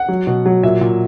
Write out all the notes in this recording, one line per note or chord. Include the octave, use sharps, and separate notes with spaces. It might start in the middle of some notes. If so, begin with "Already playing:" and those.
Already playing: F#5
F#3
B2
F#3
A#2 E5
A#2